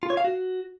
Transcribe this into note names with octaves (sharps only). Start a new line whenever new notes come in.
F4
C#5
F5
F#4